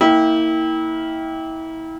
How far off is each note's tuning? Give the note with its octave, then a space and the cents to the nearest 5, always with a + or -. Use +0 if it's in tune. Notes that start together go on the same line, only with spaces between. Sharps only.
A#3 -10 E4 -30 G5 +0